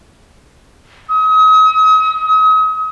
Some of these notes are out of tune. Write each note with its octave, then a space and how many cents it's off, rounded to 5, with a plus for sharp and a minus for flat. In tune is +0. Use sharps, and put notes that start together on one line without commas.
D#6 +40